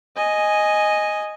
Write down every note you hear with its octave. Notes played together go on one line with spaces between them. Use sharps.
D#5 G#5